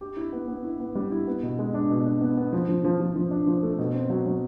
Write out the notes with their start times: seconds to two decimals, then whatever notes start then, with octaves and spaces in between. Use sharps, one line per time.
0.01 G4
0.17 E4
0.33 B3
0.48 B3
0.64 E4
0.80 B3
0.95 G3
1.11 E4
1.27 B3
1.43 B2
1.59 G#3
1.74 D4
1.90 B2
2.06 D4
2.21 B3
2.37 B3
2.53 F3
2.69 F3
2.84 F3
3.00 F3
3.16 F3
3.31 D4
3.47 F3
3.63 A3
3.79 B2
3.94 C4
4.10 F#3
4.26 F#3